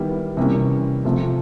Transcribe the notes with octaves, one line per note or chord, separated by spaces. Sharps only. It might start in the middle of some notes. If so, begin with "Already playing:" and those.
Already playing: D#3 G3 B3 E4 G4
C3 E3 G3 A#3 C#4
C3 F3 A3